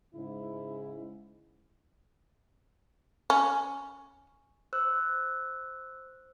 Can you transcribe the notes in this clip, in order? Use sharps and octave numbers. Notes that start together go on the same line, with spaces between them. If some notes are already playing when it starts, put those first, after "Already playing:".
G#2 C#3 E4
C#4
C5 E6 F#6